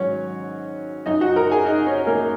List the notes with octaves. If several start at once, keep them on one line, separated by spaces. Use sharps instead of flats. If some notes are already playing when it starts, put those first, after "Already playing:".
Already playing: G#2 D#3 F#3 C#4 C#5
F#2 F#3 D#4 D#5
F#4 F#5
A#4 A#5
G#4 G#5
D#4 D#5
C#4 C#5
A#3 A#4